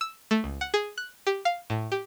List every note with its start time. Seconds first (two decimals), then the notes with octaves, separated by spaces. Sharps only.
0.01 E6
0.31 A3
0.44 C#2
0.61 F#5
0.74 G#4
0.98 F#6
1.27 G4
1.45 F5
1.70 A2
1.92 G4